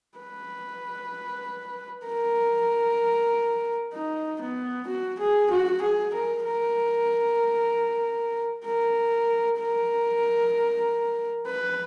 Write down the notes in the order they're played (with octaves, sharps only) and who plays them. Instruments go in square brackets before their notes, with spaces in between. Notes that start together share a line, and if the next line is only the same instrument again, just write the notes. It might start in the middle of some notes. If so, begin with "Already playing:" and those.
[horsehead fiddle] B4
A#4
D#4
B3
F#4
G#4
F#4
G#4
A#4
A#4
A#4
A#4
B4